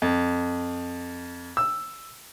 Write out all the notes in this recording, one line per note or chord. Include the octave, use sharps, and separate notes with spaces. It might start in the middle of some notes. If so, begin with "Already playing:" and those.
F2
E6